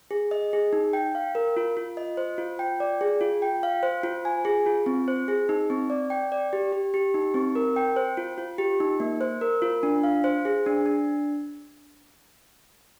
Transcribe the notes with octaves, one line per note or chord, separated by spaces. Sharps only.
G#4
D#5
G#4
D#4
G5
F5
A#4
F4
F4
D#5
C5
F4
G5
D5
G#4
F4
G5
F5
C5
F4
G#5
G#4
F4
C4
C5
G#4
D#4
C4
D5
G5
D5
G4
G4
G4
D#4
C4
A#4
G5
C5
F4
F4
G4
D#4
A#3
C5
A#4
F4
D4
F5
C5
G#4
D4
D4